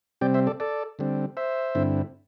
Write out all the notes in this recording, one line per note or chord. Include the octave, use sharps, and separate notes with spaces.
C3 G3 C4 D5 G5
C5 E5
A4 D5
A4 D5
D3 G3 C4
C5 E5
G2 D3 C4 E4